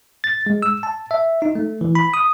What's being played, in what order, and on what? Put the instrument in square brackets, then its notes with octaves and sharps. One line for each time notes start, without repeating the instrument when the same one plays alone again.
[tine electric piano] A6
G#3
E6
A5
E5
D#4
A3
E3
B5
D#6